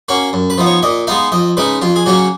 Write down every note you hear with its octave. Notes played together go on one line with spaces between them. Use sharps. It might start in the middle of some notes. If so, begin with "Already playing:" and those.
A#3 C#4 F#4
F#2
B4
F3 B3 D#4
C#5
A#2 D#5
G#3 B3 D#4 F5
F2 D#5
C#3 G#3 D#4 B4
F2 F4
G#4
C#3 F#3 A#3 C#4 F#4